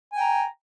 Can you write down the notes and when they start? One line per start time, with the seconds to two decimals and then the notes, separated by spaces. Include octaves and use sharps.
0.13 G#5
0.16 G5
0.20 A#5